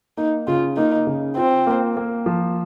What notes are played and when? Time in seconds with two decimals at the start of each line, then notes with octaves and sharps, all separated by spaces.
0.17 A#3 D#4
0.47 C#3 F4
0.77 A#3 D#4
1.07 C#3
1.37 C4 F4
1.67 A#3
1.97 A#3
2.26 F3